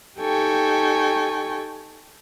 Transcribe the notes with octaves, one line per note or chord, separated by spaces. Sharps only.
D#4 G4 A4 G5 G#5 C#6